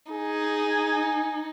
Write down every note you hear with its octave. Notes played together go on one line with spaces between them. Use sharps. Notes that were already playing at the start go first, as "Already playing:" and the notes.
D#4 G#4 G#5